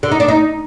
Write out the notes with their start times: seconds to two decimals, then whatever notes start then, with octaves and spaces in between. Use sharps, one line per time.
0.03 D3
0.11 D#4
0.20 D4
0.28 D#4